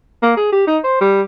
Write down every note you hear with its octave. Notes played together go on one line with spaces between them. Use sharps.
A#3
G#4
G4
D#4
C5
G3